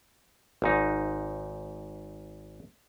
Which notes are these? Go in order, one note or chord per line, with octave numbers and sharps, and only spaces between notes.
G#1 G#2 D#4